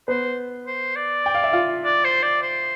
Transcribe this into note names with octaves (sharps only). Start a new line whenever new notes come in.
B3 B4 C5
C5
D5
G5
F5
E5
F4 F5
D5
C5
D5
C5